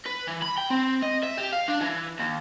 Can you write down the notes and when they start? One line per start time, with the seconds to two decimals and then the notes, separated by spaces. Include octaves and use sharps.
0.06 B4
0.28 E3
0.42 B5
0.58 G5
0.70 C4
1.02 D#5
1.23 E5
1.37 G4
1.53 F5
1.68 D4
1.81 E3
2.19 D#2